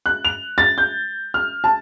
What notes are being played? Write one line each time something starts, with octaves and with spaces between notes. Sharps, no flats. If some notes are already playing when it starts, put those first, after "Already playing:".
F#6
F7
A6
G6
F6
A5